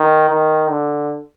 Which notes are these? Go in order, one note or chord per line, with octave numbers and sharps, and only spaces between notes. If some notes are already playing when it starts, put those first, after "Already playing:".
Already playing: D#3
D#3
D3